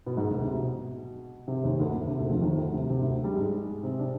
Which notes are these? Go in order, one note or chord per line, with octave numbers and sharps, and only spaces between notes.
B2 B3
G#2 G#3
D2 D3
C3
B2
C3
D#2 D#3
D2 D3
D2 D3
C3
D2 D3
F2 F3
D#2 D#3
D2 D3
C3
C3
D2 D3
G2 G3
G#2 G#3
C3 C4
D4